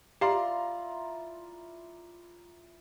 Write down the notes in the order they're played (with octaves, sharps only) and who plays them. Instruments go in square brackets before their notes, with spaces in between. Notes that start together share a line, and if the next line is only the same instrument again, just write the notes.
[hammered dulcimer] E4 F4 [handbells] G4 F5 [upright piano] D5 A#5 C6